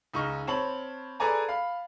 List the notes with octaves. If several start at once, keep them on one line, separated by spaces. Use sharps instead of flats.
C#2 D#4 C#6 F6
C4 C#5 A5 B5 F#7
G#4 A4 B4 D5 G#5 A#5
F5 B5